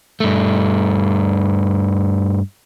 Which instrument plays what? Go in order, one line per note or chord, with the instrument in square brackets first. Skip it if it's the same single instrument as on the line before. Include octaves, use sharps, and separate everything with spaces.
[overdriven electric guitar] G2 A3